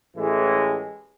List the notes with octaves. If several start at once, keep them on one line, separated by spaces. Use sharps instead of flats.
A1 A2 E3 G#3